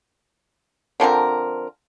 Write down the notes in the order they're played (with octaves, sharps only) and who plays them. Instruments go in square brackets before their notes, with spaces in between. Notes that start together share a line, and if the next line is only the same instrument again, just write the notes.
[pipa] D3 F3 C4 A#4